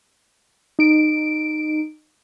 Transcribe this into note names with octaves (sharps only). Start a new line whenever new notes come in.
D#4 D7